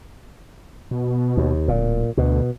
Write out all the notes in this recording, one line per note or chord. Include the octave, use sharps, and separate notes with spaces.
B2
D#2
D1 A#2
D2 B2